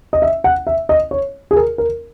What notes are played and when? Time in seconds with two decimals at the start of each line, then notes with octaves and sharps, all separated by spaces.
0.13 D#5
0.22 E5
0.44 F#5
0.67 E5
0.89 D#5
1.11 C#5
1.51 G#4
1.56 A#4
1.78 A#4